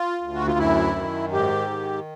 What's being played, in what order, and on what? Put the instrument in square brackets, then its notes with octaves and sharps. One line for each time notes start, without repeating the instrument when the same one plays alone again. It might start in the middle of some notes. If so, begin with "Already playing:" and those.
Already playing: [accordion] F4
D2
F#4
F4
F#2 E4
D#3
G#2 G4
D#3